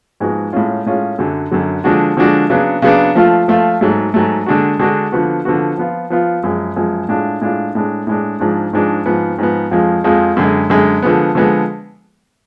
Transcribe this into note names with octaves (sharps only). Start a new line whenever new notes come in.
G#2 F3 G#3 B3 F#4
A2 G#3 C#4 F4
A2 G#3 C#4 F4
F#2 D3 F#3
F#2 D3 F#3
D3 F3 G#3 D4 F#4
D3 F3 G#3 D4 F#4
C#3 F#3 B3 D4
C#3 F#3 B3 D4
F3 A3 F4
F3 A3 F4
G#2 F#3 A3
G#2 F#3 A3
D3 G#3 D4 F#4
D3 G#3 D4 F#4
D3 F3 B3 F#4
D3 F3 B3 F#4
F3 B3 F4
F3 B3 F4
F#2 F3 G#3
F#2 F3 G#3
A2 G#3 D4 F4
A2 G#3 D4 F4
A2 G#3 D4
A2 G#3 D4
G#2 F3 G#3 D4
G#2 F3 G#3 D4
G#2 F3 B3
G#2 F3 B3
F2 F3 G#3
F2 F3 G#3
F#2 D3 G#3
F#2 D3 G#3
D3 F3 G#3 B3
D3 F3 G#3 B3